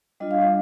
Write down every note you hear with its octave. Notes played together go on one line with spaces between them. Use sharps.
G3 D4 F4 D#5
F5
D#5